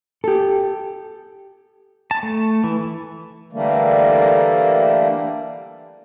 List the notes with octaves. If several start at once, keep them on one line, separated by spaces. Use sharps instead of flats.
G4 A4
A5
A3
E3
D3 E3 G3 A3 A#3